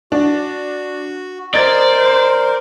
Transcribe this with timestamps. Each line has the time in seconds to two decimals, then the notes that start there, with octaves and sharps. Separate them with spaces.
0.12 D4 F#4
1.54 A#4 C5 D5 D#5 G#6 A6